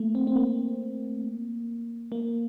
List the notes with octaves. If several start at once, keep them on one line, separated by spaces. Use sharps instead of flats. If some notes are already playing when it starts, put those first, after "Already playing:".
Already playing: A3 A#3
C4
C4
A#3
A#3